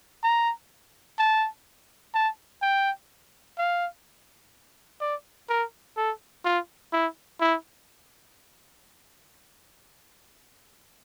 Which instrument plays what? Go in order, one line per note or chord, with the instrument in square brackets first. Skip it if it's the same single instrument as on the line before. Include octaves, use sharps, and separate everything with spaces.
[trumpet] A#5
A5
A5
G5
F5
D5
A#4
A4
F4
E4
E4